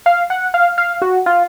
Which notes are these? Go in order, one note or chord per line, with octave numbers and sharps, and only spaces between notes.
F5
F#5
F5
F5
F#4
F4